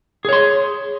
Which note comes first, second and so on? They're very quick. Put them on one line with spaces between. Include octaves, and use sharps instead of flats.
G#4 C#5 C6